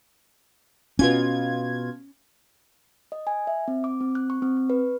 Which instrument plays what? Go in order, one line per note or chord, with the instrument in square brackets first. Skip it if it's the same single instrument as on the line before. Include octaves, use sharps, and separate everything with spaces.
[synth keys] B2 F4 G#6 [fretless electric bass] C#4
[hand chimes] D#5
G#5
E5
C4
D6
C4
F#6
C#6
C4
C#6
B4